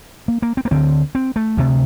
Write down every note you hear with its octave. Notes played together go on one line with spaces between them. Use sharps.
A#3
A#3
C4
A#3
D2 D3 C4
C4
A3
D2 C3